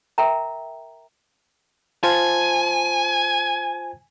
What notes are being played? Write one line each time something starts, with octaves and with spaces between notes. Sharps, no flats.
A#4 E5 G5 A#5
F4 C5 G#5 A5